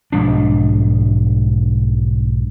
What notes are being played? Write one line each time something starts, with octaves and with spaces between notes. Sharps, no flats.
B1 G#2 F3 D4